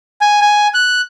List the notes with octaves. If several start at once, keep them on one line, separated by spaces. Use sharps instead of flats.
G#5
G#5
F#6